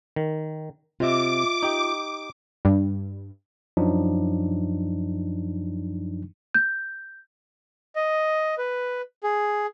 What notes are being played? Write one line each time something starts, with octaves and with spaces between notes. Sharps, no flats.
D#3
C3 F4 D#5 E5 D6
D#4 G4
G2
F#2 F3 F#3 D4 D#4
G6
D#5
B4
G#4